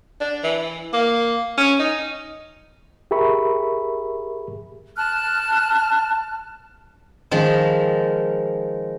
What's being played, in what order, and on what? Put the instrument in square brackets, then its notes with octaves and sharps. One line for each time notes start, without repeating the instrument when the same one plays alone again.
[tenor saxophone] D4
E3
A#3
C#4
D#4
[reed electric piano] G4 G#4 A#4 E5 B5 C#6
[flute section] A5 F6 F#6
[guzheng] D#3 F3 G#3